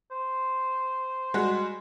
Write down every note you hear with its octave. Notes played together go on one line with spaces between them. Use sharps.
C5
G3 G#3 F#4